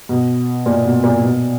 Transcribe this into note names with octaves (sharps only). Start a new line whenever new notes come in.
B2
A#2
B2
A#2
B2